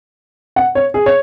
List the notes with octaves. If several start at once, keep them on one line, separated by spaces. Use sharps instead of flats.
F#5
C#5
G#4
C#5